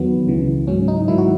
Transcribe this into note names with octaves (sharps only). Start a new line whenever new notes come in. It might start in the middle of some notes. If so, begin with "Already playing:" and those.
Already playing: E2 D#3 F#3 B3
C#2 C#3 E3
G#2 F#3 C#4
D#4
G#2 D#3 F#3 E4
F#4